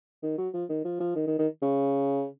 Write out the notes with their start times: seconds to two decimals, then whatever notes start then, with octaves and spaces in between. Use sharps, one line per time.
0.23 D#3
0.38 F#3
0.54 F3
0.69 D#3
0.85 F3
1.00 F3
1.16 D#3
1.27 D#3
1.39 D#3
1.62 C#3